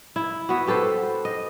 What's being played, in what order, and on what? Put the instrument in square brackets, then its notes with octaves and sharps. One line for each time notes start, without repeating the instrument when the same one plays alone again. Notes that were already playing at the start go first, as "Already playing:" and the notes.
[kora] E4
B3 F#4
G4 A4 B4 C5
D#5